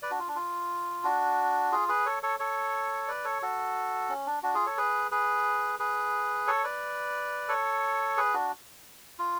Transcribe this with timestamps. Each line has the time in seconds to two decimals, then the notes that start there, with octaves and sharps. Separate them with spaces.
0.02 B4 D5
0.11 D4 F#4
0.19 F4
0.28 D4
0.36 F4
1.04 D4 F#4
1.72 F4 G#4
1.88 G#4 B4
2.06 A4 C#5
2.23 A4 C#5
2.39 A4 C#5
3.07 B4 D5
3.24 A4 C#5
3.42 F#4 A4
4.09 C#4
4.27 D4
4.43 D4 F#4
4.55 F4 G#4
4.66 A4 C#5
4.77 G#4 B4
5.11 G#4 B4
5.79 G#4 B4
6.47 A4 C#5
6.64 B4 D5
7.48 A4 C#5
8.17 G#4 B4
8.34 D4 F#4
9.19 F4